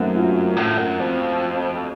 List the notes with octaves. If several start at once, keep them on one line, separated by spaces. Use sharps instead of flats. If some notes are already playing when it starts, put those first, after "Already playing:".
Already playing: F#2 A3 A#3 C4 C#4 D#4
F4
F#4
A2
F#2
F2